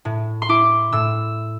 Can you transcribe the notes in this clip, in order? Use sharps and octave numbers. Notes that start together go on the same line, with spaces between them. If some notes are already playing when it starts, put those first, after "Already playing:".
A2
C6
E4 D6
A2 E6